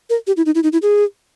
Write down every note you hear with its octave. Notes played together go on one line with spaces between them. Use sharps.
A#4
G4
E4
D#4
E4
D#4
E4
G#4